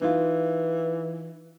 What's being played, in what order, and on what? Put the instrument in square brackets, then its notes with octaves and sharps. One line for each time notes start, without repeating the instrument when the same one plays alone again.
[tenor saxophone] E3 [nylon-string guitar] D#4 F4